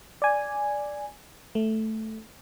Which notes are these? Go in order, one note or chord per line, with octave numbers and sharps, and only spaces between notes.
D5 G#5
A3